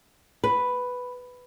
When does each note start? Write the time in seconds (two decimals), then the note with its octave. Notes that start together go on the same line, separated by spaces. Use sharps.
0.44 B4